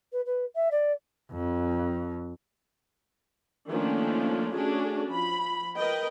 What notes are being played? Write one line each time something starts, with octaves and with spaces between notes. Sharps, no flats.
B4
B4
E5
D5
F2
D#3 F3 A3 A#3 C#4 D4
A3 C#4 D4 F#4 G#4
F3 B5
A#4 B4 D#5 G5